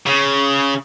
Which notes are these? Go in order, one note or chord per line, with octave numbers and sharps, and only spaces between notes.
C#3